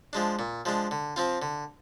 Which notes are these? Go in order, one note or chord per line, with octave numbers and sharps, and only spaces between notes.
F3 G#3 D4
A#2
F3 G#3 D4
D3
F3 C4 F4
D3